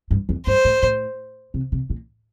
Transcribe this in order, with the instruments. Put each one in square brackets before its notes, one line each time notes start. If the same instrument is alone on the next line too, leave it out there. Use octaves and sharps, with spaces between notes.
[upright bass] G2
F2
[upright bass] G2 [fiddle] C5
[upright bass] A2
A2
C3
C3
A#2